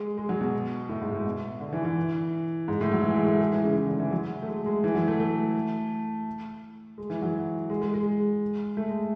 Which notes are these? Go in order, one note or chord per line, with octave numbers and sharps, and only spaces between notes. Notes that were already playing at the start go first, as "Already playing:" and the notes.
Already playing: G#3
G#3
F#3
B2
A2
G#2
A2
B2
D3
E3
E3
G#2
A2
F#3
E3
G#3
A3
G#3
E3
C#3
E3
D3
E3
F#3
A3
G#3
G#3
E3
F#3
A3
A3
G#3
E3
F#3
G#3
G#3
G#3
A3
G#3